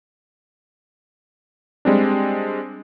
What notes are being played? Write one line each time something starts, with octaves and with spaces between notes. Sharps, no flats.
G3 G#3 C4 D4